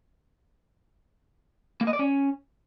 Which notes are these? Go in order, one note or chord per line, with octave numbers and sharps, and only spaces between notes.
A#3
D#5
D5
C#4